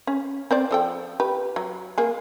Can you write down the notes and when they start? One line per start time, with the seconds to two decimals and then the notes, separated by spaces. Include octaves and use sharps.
0.07 C#4
0.51 C4 C5 D5
0.71 F3 A4 G5
1.20 G4 B4
1.56 F#3
1.98 A#3 G#4